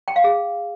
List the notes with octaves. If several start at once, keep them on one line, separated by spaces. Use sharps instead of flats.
G5
F5
G#4